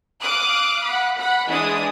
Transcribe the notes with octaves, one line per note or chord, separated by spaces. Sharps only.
F5 D6 D#6 F#6
F#5 B5
F#5 B5
E3 G#3 D4 D#6